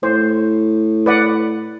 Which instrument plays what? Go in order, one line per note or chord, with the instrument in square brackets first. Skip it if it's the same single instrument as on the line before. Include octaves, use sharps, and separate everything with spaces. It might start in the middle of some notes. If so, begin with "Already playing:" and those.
[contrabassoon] A2 [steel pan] C5
[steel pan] B4 D5 F#5